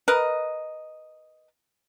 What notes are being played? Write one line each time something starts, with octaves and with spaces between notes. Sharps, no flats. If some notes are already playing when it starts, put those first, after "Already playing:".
A#4 B4 D#5